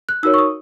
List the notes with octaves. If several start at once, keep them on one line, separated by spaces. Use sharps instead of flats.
F#6
D#4 F#4 A#4 C#5 E6
C#6
D#6